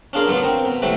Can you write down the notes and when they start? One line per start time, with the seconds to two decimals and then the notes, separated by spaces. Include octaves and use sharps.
0.13 C#4 D4 F4 G#4 A#4
0.27 B2 F#3 B3 F4
0.42 C4 A#4
0.65 B2
0.82 C3 F#3 A3 E4 B4